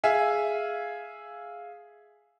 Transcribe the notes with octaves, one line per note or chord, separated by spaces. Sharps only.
G#4 E5 F5 G#5